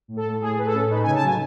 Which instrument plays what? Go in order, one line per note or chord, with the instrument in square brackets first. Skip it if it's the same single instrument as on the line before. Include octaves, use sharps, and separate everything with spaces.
[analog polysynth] A2
A4
A2
A2 G#4
A2 B4
A4
C#4
D#4 B4
C#3 G#5
A5
F#3 G#5